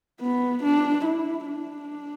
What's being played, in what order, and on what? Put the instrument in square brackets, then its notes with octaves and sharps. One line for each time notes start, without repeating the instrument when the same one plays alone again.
[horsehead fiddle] B3
D4
E4
D4